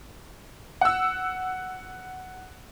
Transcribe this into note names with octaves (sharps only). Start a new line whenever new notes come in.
F#5 E6